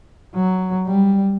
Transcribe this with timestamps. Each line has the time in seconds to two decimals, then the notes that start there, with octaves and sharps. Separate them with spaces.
0.35 F#3
0.87 G3